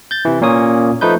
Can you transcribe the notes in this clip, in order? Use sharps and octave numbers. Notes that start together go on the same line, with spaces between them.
G6 A6
C3 E3
A#2 A#3 C#4 C#5 D#6
F3 A3 D#4 B4 G6